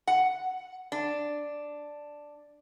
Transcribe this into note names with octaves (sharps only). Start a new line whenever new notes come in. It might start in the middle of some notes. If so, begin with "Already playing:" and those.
F#5
D4